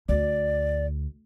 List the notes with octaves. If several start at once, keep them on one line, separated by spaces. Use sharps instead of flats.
D2 D5